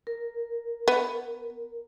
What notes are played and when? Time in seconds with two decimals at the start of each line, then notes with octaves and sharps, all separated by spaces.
0.07 A#4
0.88 B3